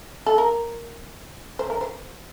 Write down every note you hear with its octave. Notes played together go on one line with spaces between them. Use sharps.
A4
A#4
C5
A#4
C5